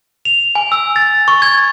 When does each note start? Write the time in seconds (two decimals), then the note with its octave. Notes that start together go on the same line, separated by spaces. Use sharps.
0.25 F7
0.55 G#5
0.72 E6
0.96 A6
1.28 C#6
1.42 G#6